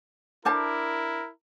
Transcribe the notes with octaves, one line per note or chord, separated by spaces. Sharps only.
D4 E4 A#4 C5 A5